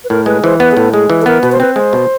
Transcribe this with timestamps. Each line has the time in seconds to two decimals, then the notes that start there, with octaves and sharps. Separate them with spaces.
0.04 B4
0.10 A2 A#4
0.26 G#3 B4
0.43 E3 C5
0.60 B3 B4
0.72 G#4
0.77 A2 A4
0.94 G#3 G#4
1.10 E3
1.21 A4
1.26 B3 A#4
1.43 B2 B4
1.52 C5
1.60 C4 B4
1.76 G#3 C5
1.93 B2